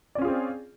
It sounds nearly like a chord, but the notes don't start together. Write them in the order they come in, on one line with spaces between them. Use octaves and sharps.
D5 C#4 F4 G#4 C4